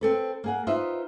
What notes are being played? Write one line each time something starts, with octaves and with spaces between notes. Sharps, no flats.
C4 A4 B4
A#3 G#4 F#5
D#4 F4 B4 C5 D#5 E5